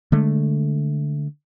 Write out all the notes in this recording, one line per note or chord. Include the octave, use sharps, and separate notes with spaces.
D3 G#3 A3